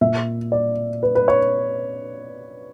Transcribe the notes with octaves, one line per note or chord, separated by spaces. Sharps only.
A#2 E5
D5
B4
B4
C#5